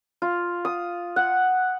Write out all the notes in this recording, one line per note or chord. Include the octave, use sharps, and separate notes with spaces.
F4
D#6
F#5